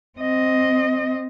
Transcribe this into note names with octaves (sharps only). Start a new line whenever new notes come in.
C4 D#5